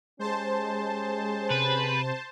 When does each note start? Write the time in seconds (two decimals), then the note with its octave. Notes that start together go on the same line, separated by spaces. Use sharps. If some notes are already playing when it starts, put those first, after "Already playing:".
0.19 G#3 C#4 G4 G#4 C5 A5
1.51 C3 B4